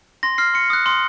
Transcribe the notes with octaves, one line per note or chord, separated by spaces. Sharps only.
C6 A#6
F6 C7
C6 C#7
D#6 F#6
C6